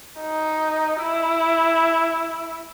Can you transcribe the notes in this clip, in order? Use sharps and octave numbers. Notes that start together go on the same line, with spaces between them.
D#4
E4